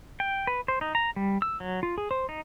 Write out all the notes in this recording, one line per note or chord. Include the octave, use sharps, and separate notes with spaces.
G5
B4
C5
D#4
A#5
G3
E6
F#3
F4
G#4
C5
D#4